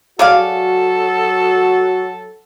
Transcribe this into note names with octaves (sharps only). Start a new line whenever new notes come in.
F#3 F#4 G#4 A4 D5 F5